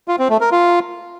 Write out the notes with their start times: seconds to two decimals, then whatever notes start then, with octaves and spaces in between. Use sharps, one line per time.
0.08 F4
0.19 C4
0.30 A3
0.41 A#4
0.52 F4